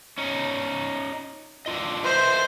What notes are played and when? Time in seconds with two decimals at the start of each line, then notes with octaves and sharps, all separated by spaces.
0.18 C#4 D#4
1.66 D4 F4 D#5
2.04 B4 C5 D#5 E5